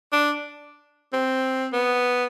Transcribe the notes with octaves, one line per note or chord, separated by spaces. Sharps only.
D4
C4
B3